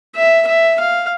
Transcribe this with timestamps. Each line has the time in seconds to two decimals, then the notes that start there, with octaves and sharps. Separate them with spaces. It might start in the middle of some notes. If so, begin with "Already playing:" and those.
0.16 E5
0.47 E5
0.79 F5